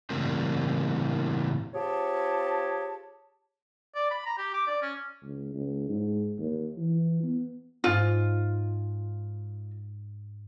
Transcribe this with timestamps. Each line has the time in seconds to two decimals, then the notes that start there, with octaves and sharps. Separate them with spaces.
0.10 A2 C#3 E3 G3 A#3 C4
1.74 C4 F4 G4 G#4 C#5 A5
3.95 D5
4.11 B5
4.26 A#5
4.38 G4
4.54 D6
4.68 D5
4.82 C#4
5.24 C#2
5.54 C#2
5.89 G#2
6.39 D#2
6.77 E3
7.23 B3
7.84 G#2 F4 D#6